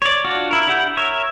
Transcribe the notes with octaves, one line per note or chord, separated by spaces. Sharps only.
C#5 D5
D4 F4 F#4
E4 A#4
D4 E4 G4 F#5 G6
A#4 C#5 E5